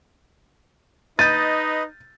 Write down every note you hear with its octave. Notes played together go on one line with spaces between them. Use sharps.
D#4 B4 D#5 G6 A6 D#7